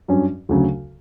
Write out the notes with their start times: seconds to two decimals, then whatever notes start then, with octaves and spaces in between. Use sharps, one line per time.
0.08 G2 F#3 C#4
0.49 D2 C#3 F#3